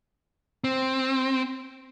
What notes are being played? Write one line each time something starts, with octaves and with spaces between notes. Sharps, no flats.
C4